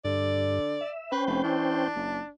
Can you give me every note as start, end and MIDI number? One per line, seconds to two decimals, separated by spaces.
0.05 0.59 43
0.05 0.78 50
0.05 0.91 74
0.81 1.12 76
1.12 1.88 61
1.12 1.26 71
1.12 1.88 72
1.12 1.88 79
1.27 1.43 29
1.27 1.42 71
1.44 1.89 52
1.44 2.30 62
1.95 2.20 30